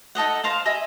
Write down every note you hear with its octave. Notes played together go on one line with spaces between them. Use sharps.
D#4 A4 D#5 F#5
A#4 C5 F5 A5
D#5 E5 G#5 B5